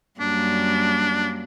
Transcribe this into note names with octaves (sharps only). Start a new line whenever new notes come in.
F#2 G3 A#3 D4